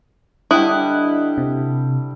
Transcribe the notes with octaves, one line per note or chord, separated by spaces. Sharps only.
D3 G3 E4 D#5 G5 D#6 F#6
C3